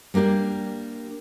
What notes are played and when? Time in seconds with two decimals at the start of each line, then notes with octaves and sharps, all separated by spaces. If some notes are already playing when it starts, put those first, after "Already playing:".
0.14 G3 A#3 D4 G4 D5